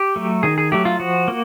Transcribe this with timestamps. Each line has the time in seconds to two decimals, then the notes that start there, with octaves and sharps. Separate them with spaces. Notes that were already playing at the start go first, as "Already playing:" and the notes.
Already playing: G4
0.16 F#3 A3
0.43 D#3 G#4
0.58 G#4
0.72 F#3 A3 G4
0.85 F4
1.00 F3 F#4
1.28 A#3